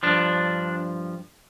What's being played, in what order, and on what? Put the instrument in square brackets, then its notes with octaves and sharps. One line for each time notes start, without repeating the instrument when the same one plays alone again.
[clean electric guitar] G2 F3 D4